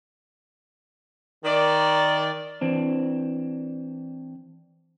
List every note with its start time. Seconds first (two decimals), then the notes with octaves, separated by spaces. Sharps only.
1.45 D#3 D5
2.61 E3 C4 D4